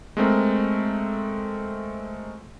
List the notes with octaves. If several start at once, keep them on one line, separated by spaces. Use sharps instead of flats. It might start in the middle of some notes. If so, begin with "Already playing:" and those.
G#3 A3 C4 A#4